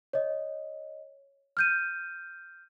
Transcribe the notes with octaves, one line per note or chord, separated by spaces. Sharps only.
C#5 D#5
F6 G6 D#7